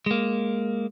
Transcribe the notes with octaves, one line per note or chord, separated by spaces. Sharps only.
G#3 A#3